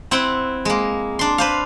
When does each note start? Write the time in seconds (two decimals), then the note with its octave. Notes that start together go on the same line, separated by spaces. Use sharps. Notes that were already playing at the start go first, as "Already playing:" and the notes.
0.11 C4 E4 F#5
0.65 G#3 A#3
1.19 D4 C6
1.38 B4 C5 F5